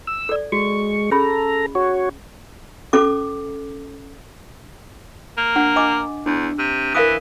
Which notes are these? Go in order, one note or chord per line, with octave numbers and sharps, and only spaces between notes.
E6
A4 D5
G#3 F#4 C#6
C#4 G#4 A4 A#5 B5
F#4 C#5
C#4 A4 D6
A#3
D4 F#5
D#5 G#5 D6
E2 D4
C3
E3 A#4 F5 D#6